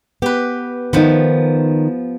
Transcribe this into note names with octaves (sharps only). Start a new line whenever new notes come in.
B3 G4 B4
D#3 F3 B3 D#4